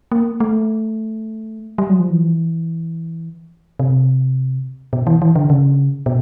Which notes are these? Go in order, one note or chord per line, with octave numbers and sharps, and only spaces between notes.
A#3
A3
G3
F#3
F3
E3
C3
B2
E3
E3
D3
C#3
B2